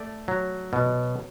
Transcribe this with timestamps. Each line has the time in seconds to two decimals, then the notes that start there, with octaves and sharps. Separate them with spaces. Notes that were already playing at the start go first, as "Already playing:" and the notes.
Already playing: A3 D5
0.28 F#3
0.73 B2